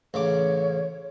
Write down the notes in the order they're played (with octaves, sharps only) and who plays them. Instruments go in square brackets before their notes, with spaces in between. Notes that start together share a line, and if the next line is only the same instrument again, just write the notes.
[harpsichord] A1 C#3 D6 [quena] C#5